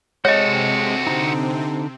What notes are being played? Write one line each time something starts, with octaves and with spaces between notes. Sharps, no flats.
C3 G#3 C4 F#4 A4 C#5 D#5
D3 D#4